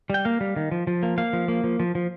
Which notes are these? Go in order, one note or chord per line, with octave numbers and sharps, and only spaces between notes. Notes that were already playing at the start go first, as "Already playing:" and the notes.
G3 G5
A#3 F5
G3
D#3
F3
F3
A#3
A#3 F5
F3
A#3
F3
F3
F3